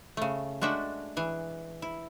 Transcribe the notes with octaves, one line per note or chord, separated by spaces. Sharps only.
C#3 A3
G#3 A3 D4 F#4 E5
E3 G#4
E4